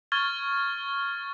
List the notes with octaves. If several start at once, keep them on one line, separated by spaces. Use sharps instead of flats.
C#6 F6 G#6 A6 G7